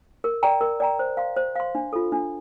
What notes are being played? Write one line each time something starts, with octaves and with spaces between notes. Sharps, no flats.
A#4
D5 G5 A#5
A#4
D5 G5 A#5
C5
F5 C6
C5
F5 C6
D4
F4 A4
D4